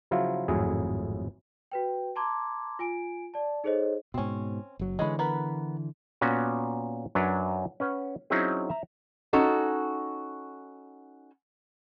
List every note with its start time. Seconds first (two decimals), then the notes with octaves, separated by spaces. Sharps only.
0.11 C#3 F3 F#3 E4 F4
0.48 G#1 F2 A2 F#3 E4 G#4
1.72 F#4 B4 G5
2.16 A5 A#5 C6 D6 G#6
2.79 F4 G#5 D7
3.34 D5 A5
3.64 D#4 G#4 A4 C5 C#5 D#5
4.14 G#2 B2 C4 C#4
4.79 F#1 F#3
4.99 D3 E3 G#3 C#4 B4
5.19 B3 A#4 B4
6.21 A#2 B3 C#4 F#4
7.15 F#2 F#3 D4 B4 C#5
7.80 C#4 B4 F#5
8.30 F#3 C4 C#4 D#4 E4 G#4
8.70 E5 A#5
9.33 C#4 D#4 F#4 A4